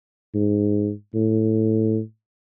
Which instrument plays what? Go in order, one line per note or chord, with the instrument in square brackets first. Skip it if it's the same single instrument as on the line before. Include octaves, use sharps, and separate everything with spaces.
[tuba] G#2
A2